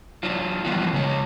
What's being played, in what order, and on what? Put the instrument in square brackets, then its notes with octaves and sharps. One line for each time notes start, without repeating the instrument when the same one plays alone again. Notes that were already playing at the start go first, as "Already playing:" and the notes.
[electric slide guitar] F#3 D4 F4
E3 F3 G3 B3 F4 F#4
C#3 G#3 C#5